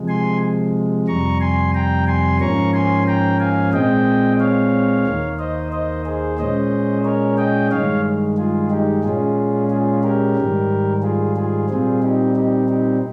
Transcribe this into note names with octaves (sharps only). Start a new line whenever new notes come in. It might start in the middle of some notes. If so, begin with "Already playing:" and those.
Already playing: C3 F3 G#3
G#5 C6
F2 C3 G3 A#5 C#6
G#5 C6
G5 A#5
G#5 C6
G#2 F3 A#3 C#4 A#5 C#6
G#5 C6
G5 A#5
F5 G#5
A#2 G#3 C4 D#5 G5
C#5 F5
D#2 D#3 A#3
C5 D#5
C5 D#5
G#4 C5
A#2 G#3 C#4 C5 D#5
A#4 C#5
D#5 G5
G2 D#3 G#3 C#5 F5
F4 G#4
D#4 G4
A#2 G#3 C#4 F4 G#4
F4 G#4
G4 A#4
G#2 D#3 G3
F4 G#4
F4 G#4
A#2 G3 C4 F4 G#4
D#4 G4
D#4 G4
D#4 G4